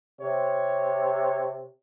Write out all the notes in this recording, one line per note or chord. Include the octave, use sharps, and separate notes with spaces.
C3 C#5